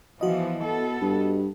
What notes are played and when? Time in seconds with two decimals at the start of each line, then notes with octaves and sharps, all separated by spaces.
0.21 E3 F3 B3 F#4 D#5
0.63 B3 A4
1.01 G2